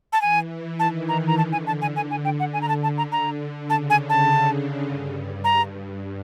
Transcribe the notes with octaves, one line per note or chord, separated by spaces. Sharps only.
A5
E3 G#5
D#3 A5
A#5
A#5
D3 A5
G#5
A5
G#5
G#5
G#5
G5
F#5
G#5
A#5
A5
A5
A#5
A#5
C#3 A5
G#5
A5
G2
A#5